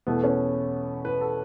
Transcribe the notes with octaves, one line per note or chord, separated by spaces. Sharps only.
E2 B2 A3 B3
C#4
B4
A4